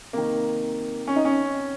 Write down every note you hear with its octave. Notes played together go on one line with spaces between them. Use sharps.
C3 D#3 A#3
C#4
D#4
C#4